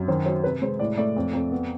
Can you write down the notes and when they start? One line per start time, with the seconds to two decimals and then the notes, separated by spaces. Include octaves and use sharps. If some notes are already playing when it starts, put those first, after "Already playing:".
Already playing: F#2
0.08 D#3 C5
0.26 F#3 C5
0.44 C3 B4
0.62 G#3 C5
0.79 A2 D5
0.97 A3 D5
1.17 F2
1.33 F2
1.52 B3